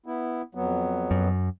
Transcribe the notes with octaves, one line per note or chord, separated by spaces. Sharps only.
B3 E4
F2 F#3 B3
F#2